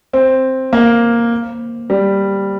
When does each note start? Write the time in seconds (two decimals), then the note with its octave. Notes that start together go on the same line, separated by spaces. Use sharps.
0.13 C4
0.73 A#3
1.90 G3